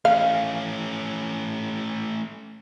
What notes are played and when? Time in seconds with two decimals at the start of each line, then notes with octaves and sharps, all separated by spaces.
0.05 A3 C#4 F5